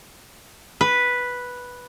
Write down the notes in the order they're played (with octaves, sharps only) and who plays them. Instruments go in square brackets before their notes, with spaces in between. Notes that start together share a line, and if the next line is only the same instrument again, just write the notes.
[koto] B4